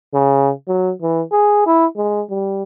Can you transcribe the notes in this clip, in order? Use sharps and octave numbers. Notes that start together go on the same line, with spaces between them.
C#3
F#3
E3
G#4
E4
G#3
G3